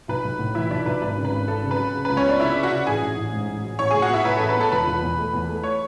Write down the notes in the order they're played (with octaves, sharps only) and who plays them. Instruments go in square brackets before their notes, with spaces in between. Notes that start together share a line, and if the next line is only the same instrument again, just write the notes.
[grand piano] B1 [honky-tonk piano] B4
[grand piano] B1
A2
[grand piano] E3 [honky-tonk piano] E4 E5
[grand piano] B1 [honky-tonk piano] D4 D5
[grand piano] B1 [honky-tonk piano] B4
[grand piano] G#1 [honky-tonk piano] B4
[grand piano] C#3
[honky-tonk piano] B4
[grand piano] G#1
[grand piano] G#1 [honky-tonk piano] A4
[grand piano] C#3
[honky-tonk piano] B4
[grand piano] F#3
C#3
[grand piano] C#2 [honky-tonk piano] B4
[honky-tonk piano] C#4 C#5
[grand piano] B3 [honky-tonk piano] D4 D5
[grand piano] C#3 [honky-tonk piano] E4 E5
[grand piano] C#3
[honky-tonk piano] F#4 F#5
[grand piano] C#3
[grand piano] A1 [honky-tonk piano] G#4 G#5
[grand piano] A1
A1
G#2
A1
F#3
[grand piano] A1 [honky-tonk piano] C#5 C#6
[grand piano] A2 [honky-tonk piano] G#4 G#5
[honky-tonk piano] F#4 F#5
[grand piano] B3 [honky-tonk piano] E4 E5
[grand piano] A2 [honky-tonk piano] B4
[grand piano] A1 [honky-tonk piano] A4
[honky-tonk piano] B4
[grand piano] B3 [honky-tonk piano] A4 A5
[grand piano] E1 [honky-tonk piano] B4 B5
[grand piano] E1
E2
A3
E2
A3
[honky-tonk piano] C#5 C#6